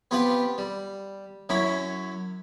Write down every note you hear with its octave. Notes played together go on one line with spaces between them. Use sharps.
B3 C4 F4 G4 B4
G3
F#2 F#3 C#4 E4 B5